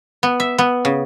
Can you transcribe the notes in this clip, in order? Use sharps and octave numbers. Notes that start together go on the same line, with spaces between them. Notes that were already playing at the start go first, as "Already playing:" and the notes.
B3
E5
B3
C#3